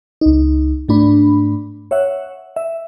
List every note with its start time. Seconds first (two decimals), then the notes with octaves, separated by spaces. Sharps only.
0.21 C#2 D#4
0.88 G#2 A3 D4 B5
1.91 C#5 E5 F#5
2.56 E5